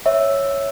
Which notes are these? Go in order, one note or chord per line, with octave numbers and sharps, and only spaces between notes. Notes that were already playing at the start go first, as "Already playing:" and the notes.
C#5 E5